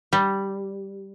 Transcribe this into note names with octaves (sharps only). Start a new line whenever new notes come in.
G3